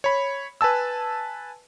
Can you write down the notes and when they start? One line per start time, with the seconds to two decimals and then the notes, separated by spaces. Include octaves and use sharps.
0.04 C#5 B5
0.61 B4 G#5 A5 E6